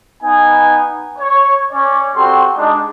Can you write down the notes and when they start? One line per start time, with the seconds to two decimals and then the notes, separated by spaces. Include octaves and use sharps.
0.23 B3 D#4 G#5
1.19 C#5
1.72 C#4 C#5 D5
2.16 G3 C4 F#4 G4 A4 C6
2.57 G#3 D4 D#4